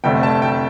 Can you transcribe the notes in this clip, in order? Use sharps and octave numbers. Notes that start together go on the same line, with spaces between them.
F1 F2 D3 A3 G5
A5
G5